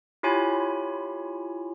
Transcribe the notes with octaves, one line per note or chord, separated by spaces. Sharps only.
E4 F4 G4 C#5 G#5 B5